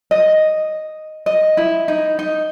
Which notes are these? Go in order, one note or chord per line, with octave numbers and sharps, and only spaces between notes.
D#5
D#5
E4
D#4
D#4